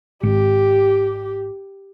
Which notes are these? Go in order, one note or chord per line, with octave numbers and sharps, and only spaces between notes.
G#1 G4